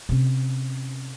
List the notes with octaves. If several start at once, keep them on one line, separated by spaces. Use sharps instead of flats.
C3 C#4